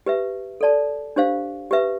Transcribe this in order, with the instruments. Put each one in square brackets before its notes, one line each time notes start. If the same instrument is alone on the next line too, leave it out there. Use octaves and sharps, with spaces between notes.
[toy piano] G4 B4 E5
A4 D5 A5
D4 G4 C5 F5
G4 B4 E5